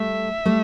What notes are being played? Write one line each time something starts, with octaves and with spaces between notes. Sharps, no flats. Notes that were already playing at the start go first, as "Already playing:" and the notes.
Already playing: G3 A3 E5
G3 A3